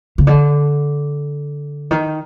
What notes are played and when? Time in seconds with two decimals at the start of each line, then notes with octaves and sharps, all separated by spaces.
0.18 C#3
0.27 D3
1.91 D#3